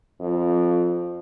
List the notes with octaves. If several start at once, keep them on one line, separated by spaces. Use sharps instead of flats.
F2